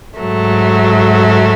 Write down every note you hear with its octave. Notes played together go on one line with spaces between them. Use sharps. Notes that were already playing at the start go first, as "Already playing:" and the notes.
G#2 F#3 A3